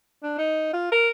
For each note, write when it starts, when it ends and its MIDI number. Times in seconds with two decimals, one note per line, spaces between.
0.23 0.36 62
0.38 0.69 63
0.73 0.89 65
0.92 1.09 70